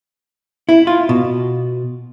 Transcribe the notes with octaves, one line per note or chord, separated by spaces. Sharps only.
E4
F4
B2